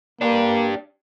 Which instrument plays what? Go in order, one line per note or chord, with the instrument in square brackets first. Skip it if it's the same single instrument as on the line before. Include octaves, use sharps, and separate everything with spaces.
[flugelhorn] A#3 [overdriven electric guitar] D4 G4